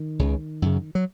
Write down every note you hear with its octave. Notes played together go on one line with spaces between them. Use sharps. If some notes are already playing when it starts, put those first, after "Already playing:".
Already playing: D#3
C#2 C#3
F#2 C#3
F#3